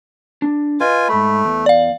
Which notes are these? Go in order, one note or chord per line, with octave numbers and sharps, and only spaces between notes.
D4
F4 B4 D#5 G#5
G#2 A3 B5
E2
D5 F5